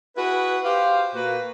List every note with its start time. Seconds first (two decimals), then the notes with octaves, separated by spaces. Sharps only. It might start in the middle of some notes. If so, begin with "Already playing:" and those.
0.16 E4 F#4 G#4 B4
0.65 G4 C5 F5
1.15 A#2 A#3 F#4 B4